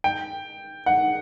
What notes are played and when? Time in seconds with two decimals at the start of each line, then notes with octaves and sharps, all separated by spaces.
0.04 G5
0.86 F#5